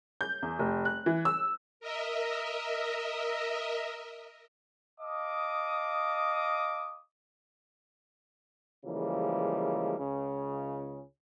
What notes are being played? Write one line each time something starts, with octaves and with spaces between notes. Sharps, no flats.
G6
E2
F1
F#6
E3
E6
A#4 D#5 E5
D#5 F5 A5 D6 D#6
C#3 E3 F3 G3 G#3 A#3
C#2 C#3